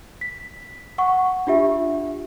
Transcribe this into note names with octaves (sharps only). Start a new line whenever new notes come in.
B6
F#5 C#6
D4 F4 G4 E5